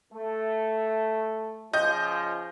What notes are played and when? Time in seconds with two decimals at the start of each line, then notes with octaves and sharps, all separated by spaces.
0.13 A3
1.73 C#3 F3 D#5 G6